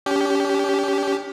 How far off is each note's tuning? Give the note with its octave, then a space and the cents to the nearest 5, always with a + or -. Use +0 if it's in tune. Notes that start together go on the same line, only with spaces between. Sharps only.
C#4 +40 G4 +0